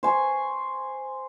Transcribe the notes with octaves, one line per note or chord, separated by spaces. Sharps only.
C5 G#5 C#6